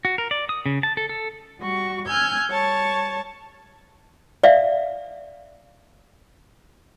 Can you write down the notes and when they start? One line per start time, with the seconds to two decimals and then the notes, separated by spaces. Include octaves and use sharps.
0.05 F#4
0.18 A#4
0.31 D5
0.49 D#6
0.66 C#3
0.83 A5
0.97 A4
1.09 A4
1.59 G3 F#4 C#6
2.06 G#5 E6 F6 G6 G#6
2.48 G3 C#5 A5 C#6
4.44 D5 E5 F5